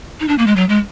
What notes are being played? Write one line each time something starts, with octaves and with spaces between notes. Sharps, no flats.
D#4
D4
A#3
G#3
F#3
G#3